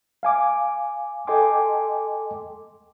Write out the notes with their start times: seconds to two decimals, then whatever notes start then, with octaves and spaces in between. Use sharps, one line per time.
0.23 F5 G#5 D6
1.27 A4 D#5 G5 G#5 C6 D6